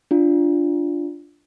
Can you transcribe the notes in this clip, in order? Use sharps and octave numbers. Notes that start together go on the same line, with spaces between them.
D4 F4